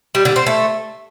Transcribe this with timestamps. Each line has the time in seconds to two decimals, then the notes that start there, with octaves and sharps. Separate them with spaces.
0.15 G3
0.25 D3
0.36 C4
0.47 A3